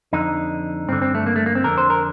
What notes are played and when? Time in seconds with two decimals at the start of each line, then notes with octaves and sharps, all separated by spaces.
0.13 F2 D3 D#4
0.88 G2 D3 C4
1.02 C4
1.15 A3
1.26 A#3
1.36 A3
1.46 A#3
1.55 C4
1.64 F2 D3 A#4
1.78 C5
1.90 A#4